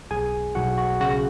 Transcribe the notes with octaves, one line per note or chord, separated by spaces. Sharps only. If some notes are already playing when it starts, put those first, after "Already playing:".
B1 G#4 G#5
B1 F#4 F#5
F#4
C#3 F#4